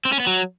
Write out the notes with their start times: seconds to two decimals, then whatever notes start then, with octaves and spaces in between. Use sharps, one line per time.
0.05 C4
0.12 C#4
0.20 B3
0.27 F#3